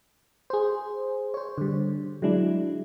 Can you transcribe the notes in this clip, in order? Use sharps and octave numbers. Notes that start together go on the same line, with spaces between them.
G#4 C5
C5 C#5
D3 G3
F#3 G#3 D4 E4